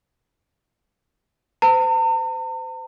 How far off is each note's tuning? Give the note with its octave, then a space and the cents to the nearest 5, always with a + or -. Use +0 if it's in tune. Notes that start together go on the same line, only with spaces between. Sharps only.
C5 -40 A#5 -45